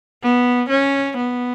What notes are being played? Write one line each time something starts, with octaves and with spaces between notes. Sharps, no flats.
B3
C#4
B3